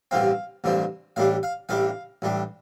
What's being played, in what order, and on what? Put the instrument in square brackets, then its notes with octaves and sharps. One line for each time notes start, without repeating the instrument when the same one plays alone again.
[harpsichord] A1 G2 D3 F3 C4 F5
A1 G2 D3 F3 C4
A1 A2 G3 D4 F5
F5
A1 A2 G3 D4 F5
A1 A2 G3 D4